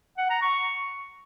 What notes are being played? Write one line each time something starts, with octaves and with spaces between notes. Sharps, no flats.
F#5
A#5
C#6